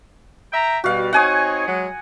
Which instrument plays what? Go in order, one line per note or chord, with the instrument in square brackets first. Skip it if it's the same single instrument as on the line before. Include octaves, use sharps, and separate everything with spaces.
[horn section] E5 G5 A#5
[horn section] B2 G3 [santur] F#4 F5
[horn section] C4 D#4 C#5 [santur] F#5 G#5 D#6
[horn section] F#3 G#3